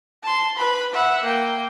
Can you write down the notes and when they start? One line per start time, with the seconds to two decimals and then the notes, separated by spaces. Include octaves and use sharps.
0.23 A5 C6
0.56 B4 B5
0.93 E5 F#5
1.23 A#3 G5